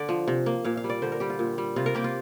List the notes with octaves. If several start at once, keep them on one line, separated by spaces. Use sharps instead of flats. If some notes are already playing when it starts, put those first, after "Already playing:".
Already playing: D3 D5
F3
C3
A#3
A#2 F5
F5
G3
D5
D3 C5
A#4
G3 G4
F4
A#2
G3
C3 F4
A#4
A#3 G4
F4